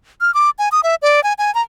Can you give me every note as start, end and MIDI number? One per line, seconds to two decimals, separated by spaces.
0.21 0.33 89
0.34 0.50 86
0.59 0.69 80
0.72 0.81 87
0.83 0.95 76
1.02 1.23 74
1.24 1.33 80
1.38 1.53 80
1.55 1.62 82